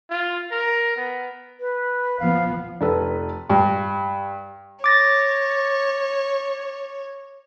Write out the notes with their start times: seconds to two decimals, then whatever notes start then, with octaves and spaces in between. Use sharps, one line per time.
0.10 F4
0.51 A#4
0.96 B3
1.60 B4
2.20 F3 B3 F5
2.81 F1 A4 B4
3.50 G2
4.84 C#5 D6 A6 A#6